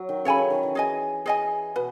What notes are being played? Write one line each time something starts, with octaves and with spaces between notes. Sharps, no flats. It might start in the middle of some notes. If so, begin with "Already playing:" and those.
Already playing: F#3
D#3
C#3 A4 C#5 G#5 B5
D#3
D#3
E3
G#4 D#5 G#5
G#4 D#5 G#5
B2 B3 B4